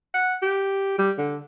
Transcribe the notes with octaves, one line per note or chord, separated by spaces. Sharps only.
F#5
G4
G3
D3